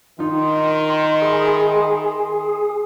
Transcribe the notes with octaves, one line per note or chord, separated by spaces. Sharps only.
D#3 D#4 F4 C6
G#4 E5 B5